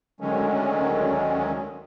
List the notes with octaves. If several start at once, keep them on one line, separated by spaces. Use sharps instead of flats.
D2 D3 D#3 F#3 G#3 C#4